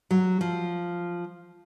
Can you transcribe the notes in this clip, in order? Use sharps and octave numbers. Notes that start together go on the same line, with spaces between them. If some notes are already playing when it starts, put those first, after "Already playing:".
F#3
F3